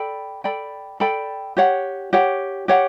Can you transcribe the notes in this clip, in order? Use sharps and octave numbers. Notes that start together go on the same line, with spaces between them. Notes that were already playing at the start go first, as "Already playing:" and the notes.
Already playing: A4 D5 G5 B5
A4 D5 G5 B5
A4 D5 G5 B5
G4 C#5 F#5
G4 C#5 F#5
G4 C#5 F#5